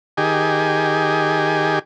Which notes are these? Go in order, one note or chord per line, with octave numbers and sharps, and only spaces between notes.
D#3 G4 G#4